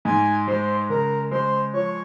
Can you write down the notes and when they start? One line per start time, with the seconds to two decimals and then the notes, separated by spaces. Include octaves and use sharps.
0.05 G#2 G#5
0.47 G#3 C5
0.89 C#3 A#4
1.31 G#3 C5
1.73 F3 C#5